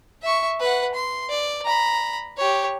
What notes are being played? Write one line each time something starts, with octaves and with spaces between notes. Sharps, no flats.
E5 C#6
B4 F#5
C6
D5
A#5 B5
G4 C#5